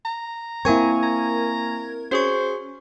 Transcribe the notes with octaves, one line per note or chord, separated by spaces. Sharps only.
A#5
A#3 C4 E4 A#4 G#5 C#6 G#6
A#5
C#4 F#4 G#4 C5 C#6